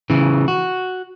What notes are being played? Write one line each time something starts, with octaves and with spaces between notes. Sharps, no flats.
C#3 E3
F#4